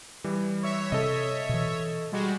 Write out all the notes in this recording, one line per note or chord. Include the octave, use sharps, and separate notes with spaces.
E3 G3
C#5 E5
C3 A4 D#5
B2 E3
G3 G#3 F#4